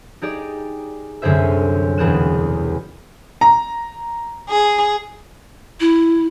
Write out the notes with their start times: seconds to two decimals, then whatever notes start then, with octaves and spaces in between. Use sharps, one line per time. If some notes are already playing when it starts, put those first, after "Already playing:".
0.22 D#4 G4 G#4 D5
1.22 C2 F#2 D3 G#4 C5 E5
1.98 E1 E2 G#4 F#6 E7
3.41 A#5
4.49 G#4
5.80 E4